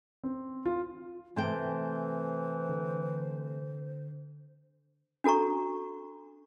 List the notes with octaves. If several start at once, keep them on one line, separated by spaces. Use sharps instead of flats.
C4
F4
C3 E3 A3 C5 G5 G#5 C6 G6
D3
D4 F#4 A4 A#5 C#6